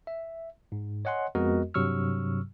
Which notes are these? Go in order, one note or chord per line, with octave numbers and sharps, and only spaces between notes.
E5
G#2
C#5 D#5 F#5 G#5 C6
F2 G#3 B3 F#4 A#4 D#5
G2 C3 F#3 C#6 E6 F6